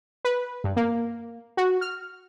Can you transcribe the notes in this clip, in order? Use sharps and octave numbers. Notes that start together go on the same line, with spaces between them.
B4
G2
A#3
F#4
F6